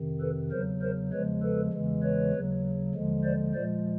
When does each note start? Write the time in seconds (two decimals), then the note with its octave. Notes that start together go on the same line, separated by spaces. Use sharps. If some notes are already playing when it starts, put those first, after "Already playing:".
Already playing: F2 C3 D#3
0.21 A4 B4
0.51 E2 C#3 F#3 A#4 C5
0.82 A#4 C5
1.12 E2 C#3 F3 G#3 B4 C#5
1.43 A4 B4
1.73 E2 C#3 E3 G#3
2.03 B4 C#5
2.33 D#2 C#3 F#3
2.94 D#2 D3 F3 G#3
3.24 C5 D5
3.54 A#2 F3 G#3 C5 D5